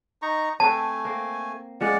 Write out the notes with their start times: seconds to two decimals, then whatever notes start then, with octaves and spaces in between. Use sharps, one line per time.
0.22 D#4 A#5 C#6
0.60 A3 C4 A4 B4 G#5 A5
1.05 A#3 C4
1.81 F3 G#3 C#4 D5 F#5